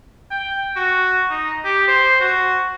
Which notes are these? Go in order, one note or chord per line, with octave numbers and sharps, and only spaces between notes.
G5
F#4
D#4
G4
C5
F#4